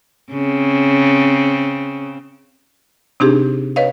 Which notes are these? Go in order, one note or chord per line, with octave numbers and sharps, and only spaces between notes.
C#3 C4
C3 C4 D4 D#4 G4 G#4
B4 C#5 D#5 F5